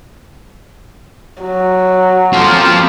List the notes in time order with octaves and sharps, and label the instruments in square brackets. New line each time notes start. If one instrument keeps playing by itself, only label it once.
[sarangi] F#3
[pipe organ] F3 A#3 F4 [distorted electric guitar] C4 A4